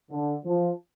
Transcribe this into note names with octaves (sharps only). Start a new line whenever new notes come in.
D3
F3